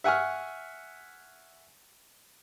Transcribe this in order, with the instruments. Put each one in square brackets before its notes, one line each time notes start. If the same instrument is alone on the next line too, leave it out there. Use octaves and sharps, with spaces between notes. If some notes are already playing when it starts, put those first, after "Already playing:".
[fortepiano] E5 F#5 G#5 C#6 F6